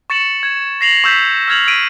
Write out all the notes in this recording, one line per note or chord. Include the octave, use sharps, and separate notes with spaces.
C#6 A6 C#7 E7 F#7
G#6
A#6 C7 F7 F#7
C#6 E6 G6 A6 B6
E6 F6 G#6 F7 F#7
E6 B6 D7 D#7